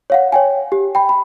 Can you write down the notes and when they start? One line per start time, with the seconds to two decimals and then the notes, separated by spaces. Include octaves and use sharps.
0.10 C#5 F5 F#5
0.32 C#5 G5 G#5
0.72 G4
0.95 G5 B5
1.09 B5